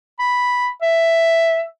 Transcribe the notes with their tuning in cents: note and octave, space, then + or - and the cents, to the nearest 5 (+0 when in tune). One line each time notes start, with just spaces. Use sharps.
B5 -5
E5 +5